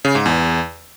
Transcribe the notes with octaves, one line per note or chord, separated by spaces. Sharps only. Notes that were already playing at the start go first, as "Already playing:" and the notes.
C#3
G#2
E2